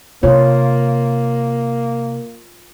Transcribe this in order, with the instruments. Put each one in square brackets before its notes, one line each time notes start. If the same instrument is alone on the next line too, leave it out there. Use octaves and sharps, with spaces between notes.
[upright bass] C3 [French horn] A#3 [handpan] F4 [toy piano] C#5